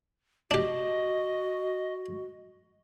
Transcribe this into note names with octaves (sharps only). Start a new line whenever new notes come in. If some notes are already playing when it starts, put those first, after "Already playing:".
D4 F#4 G4 D#5